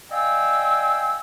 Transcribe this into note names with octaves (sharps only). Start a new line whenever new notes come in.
D5 D#5 F5 G5 G#5 E6